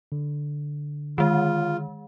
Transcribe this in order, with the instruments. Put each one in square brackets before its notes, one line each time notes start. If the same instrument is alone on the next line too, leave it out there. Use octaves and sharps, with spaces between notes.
[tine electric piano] D3
[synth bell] D#3 G#3 [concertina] F4